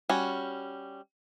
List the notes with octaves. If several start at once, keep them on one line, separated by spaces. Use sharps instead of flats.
G3 C#4 F#4